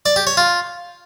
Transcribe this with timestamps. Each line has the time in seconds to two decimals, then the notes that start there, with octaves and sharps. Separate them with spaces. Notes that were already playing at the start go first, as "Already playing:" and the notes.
0.06 D5
0.16 G4
0.27 C#5
0.37 F4